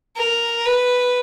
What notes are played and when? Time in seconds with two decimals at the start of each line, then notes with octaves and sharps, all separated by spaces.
0.16 A#4
0.66 B4